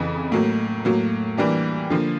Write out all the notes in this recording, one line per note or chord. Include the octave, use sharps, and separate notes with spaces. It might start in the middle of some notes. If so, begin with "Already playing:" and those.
Already playing: F2 C#3 E3
A2 F#3 A#3
A2 F#3 A#3
E3 G3 A#3 D4 G4
D3 F3 A#3